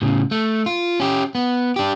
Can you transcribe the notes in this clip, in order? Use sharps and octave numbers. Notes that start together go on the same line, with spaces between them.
A2 C#3
A3
F4
C#4 G4
B3
D4 G4